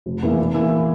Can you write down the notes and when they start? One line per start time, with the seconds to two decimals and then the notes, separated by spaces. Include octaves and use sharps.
0.06 F1
0.23 E2 E3 A#3 E4
0.38 E2
0.54 E3 A#3 E4